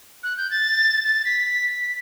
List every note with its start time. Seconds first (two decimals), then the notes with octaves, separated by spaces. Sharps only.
0.23 F#6
0.37 G6
0.51 A6
1.04 A6
1.25 B6